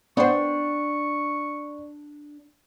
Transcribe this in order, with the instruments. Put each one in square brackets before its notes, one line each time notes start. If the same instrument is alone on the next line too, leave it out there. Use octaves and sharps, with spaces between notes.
[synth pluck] B3 C5 [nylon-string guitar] D4 G5 [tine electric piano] D5 [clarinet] C#6